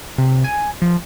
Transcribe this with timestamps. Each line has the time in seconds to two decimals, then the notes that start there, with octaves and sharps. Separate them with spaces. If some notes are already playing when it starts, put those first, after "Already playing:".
0.18 C3
0.44 G#5
0.82 F3